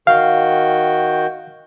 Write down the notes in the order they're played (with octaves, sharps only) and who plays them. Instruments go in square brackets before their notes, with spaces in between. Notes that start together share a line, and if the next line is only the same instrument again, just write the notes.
[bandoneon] D#3 F#4 G5 [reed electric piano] F5